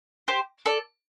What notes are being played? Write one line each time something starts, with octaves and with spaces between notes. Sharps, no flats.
G4 C5
A4 D5